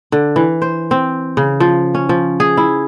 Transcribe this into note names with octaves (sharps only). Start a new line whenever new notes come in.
D3
E3
C5
C4
C#3
F3
C#4
F3
G#4
E4